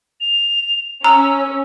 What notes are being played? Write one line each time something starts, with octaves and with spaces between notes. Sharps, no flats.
F7
C#4 A#5 E6